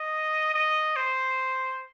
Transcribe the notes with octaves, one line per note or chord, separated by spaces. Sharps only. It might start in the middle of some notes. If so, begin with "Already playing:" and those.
Already playing: D#5
D#5
C5